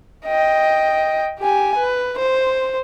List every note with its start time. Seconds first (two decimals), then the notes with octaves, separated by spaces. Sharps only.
0.26 D#5 G5
1.40 G4 G#5
1.77 B4
2.18 C5